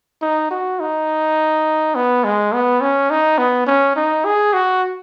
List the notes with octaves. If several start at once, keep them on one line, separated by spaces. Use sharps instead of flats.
D#4
F#4
D#4
B3
G#3
B3
C#4
D#4
B3
C#4
D#4
G#4
F#4